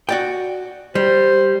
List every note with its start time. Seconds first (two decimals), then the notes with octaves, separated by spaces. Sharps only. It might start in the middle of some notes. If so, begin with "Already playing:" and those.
0.09 F#4 D5 G5
0.95 G3 C5